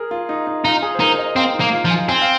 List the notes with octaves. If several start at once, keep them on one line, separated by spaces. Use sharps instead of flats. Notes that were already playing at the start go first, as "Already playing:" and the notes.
Already playing: G#4 A#4
F4
D#4
D#4
D#4 F4
G#4
C5
D#4 A#4
D#5
C4 F5
D#4
A#3
F4
F3
G#5
C4 G#5
F5